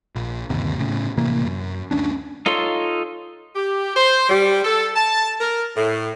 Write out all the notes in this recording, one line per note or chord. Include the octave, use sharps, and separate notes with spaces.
A#1
G1 D#2 C3
A2 C#3
A1 C3 E3 A#3
F#2
D2 A#3 C#4 D4
D#4 F4 A4 C#5 C6
G4
C5
G3
A4
A5
A#4
A2